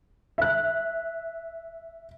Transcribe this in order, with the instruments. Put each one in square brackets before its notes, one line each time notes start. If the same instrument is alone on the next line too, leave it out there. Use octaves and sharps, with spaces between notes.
[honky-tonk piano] E5 F#6